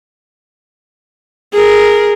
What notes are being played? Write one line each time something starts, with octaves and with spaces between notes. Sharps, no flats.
G#4 A#4